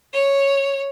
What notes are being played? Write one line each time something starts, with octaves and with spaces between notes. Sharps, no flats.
C#5